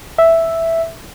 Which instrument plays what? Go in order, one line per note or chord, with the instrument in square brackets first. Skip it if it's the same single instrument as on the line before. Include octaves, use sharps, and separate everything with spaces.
[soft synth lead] E5